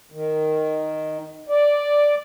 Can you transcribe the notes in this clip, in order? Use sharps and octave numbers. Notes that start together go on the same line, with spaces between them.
D#3
D5